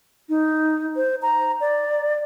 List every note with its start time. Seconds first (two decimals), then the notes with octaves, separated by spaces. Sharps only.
0.29 D#4
0.96 C5
1.22 A#5
1.61 D5